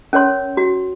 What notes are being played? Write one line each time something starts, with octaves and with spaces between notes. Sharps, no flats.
C#4 A#4 C#5 C6
F#4